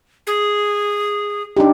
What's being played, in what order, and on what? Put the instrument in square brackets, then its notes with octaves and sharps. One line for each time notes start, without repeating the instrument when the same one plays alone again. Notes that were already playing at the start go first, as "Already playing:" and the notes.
[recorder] G#4
[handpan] D4 D#4 G4